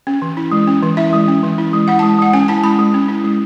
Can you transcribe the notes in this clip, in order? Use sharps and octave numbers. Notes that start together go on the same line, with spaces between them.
C#4
E3
E4
G#3
C#4
E3
E4 E5
G#3
C#4
E3
E4
G#3
E4 F#5
G#3 A5
G#3 F#5
C#4 G#5
E4 A5
G#3 B5
G#3
C#4
E4
G#3